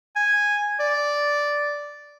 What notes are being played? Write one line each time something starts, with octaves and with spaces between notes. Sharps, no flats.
G#5
D5